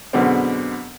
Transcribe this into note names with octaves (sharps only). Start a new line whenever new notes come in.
F#2 B2 D3 G#3 B3 C4